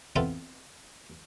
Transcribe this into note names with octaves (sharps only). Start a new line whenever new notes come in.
B3 C4 E4 F4 A4